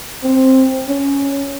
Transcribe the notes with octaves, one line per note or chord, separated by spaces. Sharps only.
C4
C#4